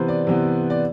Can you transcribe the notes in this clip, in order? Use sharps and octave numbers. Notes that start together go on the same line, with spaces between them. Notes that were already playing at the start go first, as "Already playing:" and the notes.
Already playing: C3 E3 B3 B4 C5
D5
C3 E3 B3
D5